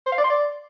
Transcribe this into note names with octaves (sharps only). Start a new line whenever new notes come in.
C5
F5
D5
C6
D5